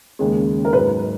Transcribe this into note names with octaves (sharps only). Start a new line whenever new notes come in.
D#2 C#3 G#3
A#4
G#2 F#3 B4